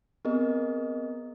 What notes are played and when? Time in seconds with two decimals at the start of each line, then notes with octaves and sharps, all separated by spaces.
0.25 B3 C4 G#4 A#4 D#5